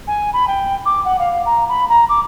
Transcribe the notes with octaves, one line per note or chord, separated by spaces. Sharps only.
G#5
B5
G5
D6
F#5
F5
A#5
B5
A#5
D6